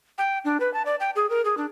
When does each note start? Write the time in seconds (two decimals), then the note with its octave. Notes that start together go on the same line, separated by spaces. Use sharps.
0.18 G5
0.45 D4
0.60 B4
0.74 A5
0.86 D5
1.00 G5
1.16 G#4
1.30 A#4
1.45 G#4
1.57 D4